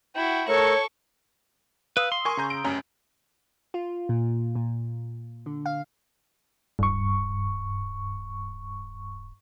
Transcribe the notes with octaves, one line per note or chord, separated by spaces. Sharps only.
E4 F#4 G5
A3 A4 A#4 C#5 C#6
B4 F5 D#6 E6
C6
A#4 G#5 C#6
C#3 A#5 G6
D7
F1 F#2 C#4 A#5
F4
A#2
A#2
D3
F5
D1 G2 C#6